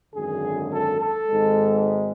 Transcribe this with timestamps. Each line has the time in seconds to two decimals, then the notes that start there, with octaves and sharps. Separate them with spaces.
0.14 G#1 F#2 D3 G#4
0.71 A4
0.99 A4
1.28 G#1 G#2 G#3